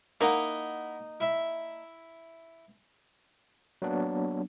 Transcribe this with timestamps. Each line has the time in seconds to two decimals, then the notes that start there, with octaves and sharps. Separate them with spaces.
0.21 A#3 D#4 E4 F#5 A#5
1.20 E4 E5
3.82 F#3 A#3 B3 D4